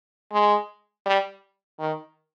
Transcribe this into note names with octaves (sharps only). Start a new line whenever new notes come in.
G#3
G3
D#3